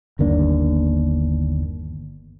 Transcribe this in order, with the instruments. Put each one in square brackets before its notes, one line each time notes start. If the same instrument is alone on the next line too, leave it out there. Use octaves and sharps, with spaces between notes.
[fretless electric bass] G1 D#2 A#3 D4